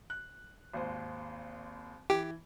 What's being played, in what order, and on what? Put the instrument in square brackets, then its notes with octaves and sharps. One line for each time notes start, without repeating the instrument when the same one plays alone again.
[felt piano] F#6
G#1 D#2 C5
[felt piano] E3 [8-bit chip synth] G4